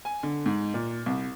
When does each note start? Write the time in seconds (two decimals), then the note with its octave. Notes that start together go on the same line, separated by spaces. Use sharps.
0.05 G#5
0.23 D3
0.46 G#2
0.74 A#2
1.06 C2